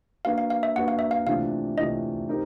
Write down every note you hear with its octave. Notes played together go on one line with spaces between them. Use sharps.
A#3 D4 F#4 B4 F5
F5
F5
E5
A#3 D4 F#4 B4 F#5
F5
E5
F5
C3 E3 A3 D4 F4 F5
C3 E3 A3 D4 F4 D#5
C4 D#4 G4 A#4